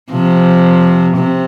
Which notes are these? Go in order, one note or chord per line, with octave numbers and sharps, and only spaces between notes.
C3 F3
C3